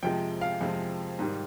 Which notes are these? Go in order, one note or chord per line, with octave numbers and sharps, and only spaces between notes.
F2 C3 F3 G#3 G5
F5
F2 C3 F3 G#3
G#2 D#3 G3